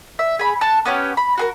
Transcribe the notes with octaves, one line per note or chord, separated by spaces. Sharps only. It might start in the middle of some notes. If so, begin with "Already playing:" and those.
E5
G#4 B5
A4 A5 F#6
B3 C#4 G4 C#5
B5
F#4 G#4 A#4